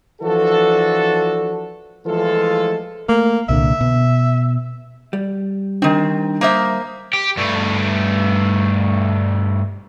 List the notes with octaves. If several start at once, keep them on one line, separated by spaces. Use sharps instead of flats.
E3 F3 D4 F#4 A4
E3 F3 G#3 A3 F4 A4
A3 A#3
C2 A#2 D3 E5
B2
G3
D#3 C4 D4
A#3 C5 E5 A#5 D#6
G4
G2 A3